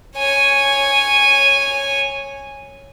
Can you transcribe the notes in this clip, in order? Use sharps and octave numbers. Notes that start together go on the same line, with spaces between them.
C#5 G#5